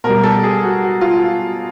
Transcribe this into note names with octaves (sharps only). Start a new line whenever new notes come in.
B2 G3 A#4
A4
G#4
F#4
F#4
F4